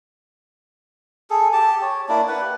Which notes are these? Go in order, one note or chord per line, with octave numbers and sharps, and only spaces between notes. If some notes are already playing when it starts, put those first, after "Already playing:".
G#4 A4
G4 A5
C#5
A#3 D4 E4 D5
B4 F#5
G4